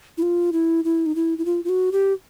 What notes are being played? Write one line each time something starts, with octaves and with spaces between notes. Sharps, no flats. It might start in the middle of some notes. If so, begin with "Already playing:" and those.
E4
F4
E4
E4
D#4
E4
E4
F4
F4
F#4
G4